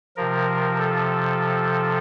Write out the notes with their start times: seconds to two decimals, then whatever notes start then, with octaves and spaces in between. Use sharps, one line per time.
0.17 C3 F3 A#4
0.77 A4